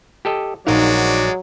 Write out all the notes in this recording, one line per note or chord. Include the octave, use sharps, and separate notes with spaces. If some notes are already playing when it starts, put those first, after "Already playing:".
G4 A4 D#5
A#1 F#3 G#3 D#4 F#4 A#4 D5 F5